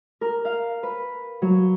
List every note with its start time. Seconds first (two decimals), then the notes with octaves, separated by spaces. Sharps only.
0.21 A#4
0.45 F5
0.83 B4
1.42 F#3